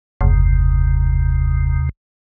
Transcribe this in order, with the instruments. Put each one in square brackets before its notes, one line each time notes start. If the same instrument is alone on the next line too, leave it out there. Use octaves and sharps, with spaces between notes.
[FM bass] F#1 [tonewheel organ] D#2 C3